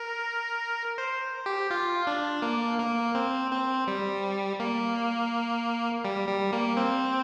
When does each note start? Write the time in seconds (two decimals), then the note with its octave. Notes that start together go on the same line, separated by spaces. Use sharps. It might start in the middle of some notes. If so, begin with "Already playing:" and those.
Already playing: A#4
0.98 C5
1.46 G4
1.70 F4
2.07 D4
2.42 A#3
2.78 A#3
3.15 C4
3.51 C4
3.87 G3
4.60 A#3
6.05 G3
6.29 G3
6.53 A#3
6.77 C4